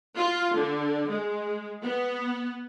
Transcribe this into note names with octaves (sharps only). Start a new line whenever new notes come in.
F4
D3
G#3
B3